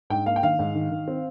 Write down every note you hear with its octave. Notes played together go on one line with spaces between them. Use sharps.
G#2 G5
A#3 F5
G5
D#3 F5
G#2
D#3
D#3
C4